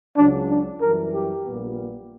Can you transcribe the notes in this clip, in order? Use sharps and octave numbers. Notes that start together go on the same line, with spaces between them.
C#2 C#3 F#3 D4
D4
F#2 E3 G3 A#4
G4
A#1 A#2 G3 B3